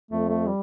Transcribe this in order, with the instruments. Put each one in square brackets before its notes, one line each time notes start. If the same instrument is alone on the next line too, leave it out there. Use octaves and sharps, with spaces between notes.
[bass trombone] F2 [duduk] A3
[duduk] A3
G3